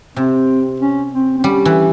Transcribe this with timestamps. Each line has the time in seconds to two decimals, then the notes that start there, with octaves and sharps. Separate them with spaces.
0.17 C3 C4
0.80 C#4
1.12 C4
1.38 C4
1.44 G3 C#4
1.65 E3